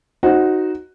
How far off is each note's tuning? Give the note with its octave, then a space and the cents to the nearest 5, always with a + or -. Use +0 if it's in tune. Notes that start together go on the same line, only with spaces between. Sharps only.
D#4 +0 F#4 +0 C5 +20